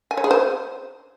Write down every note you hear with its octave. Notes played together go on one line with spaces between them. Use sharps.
G#5
C#5
G#4
C5